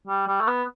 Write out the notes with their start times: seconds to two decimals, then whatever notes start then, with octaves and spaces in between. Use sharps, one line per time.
0.07 G3
0.27 G3
0.41 A3
0.47 B3